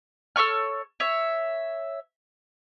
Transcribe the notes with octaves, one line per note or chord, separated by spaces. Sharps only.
A4 C#5 C#6 F6
C#5 E5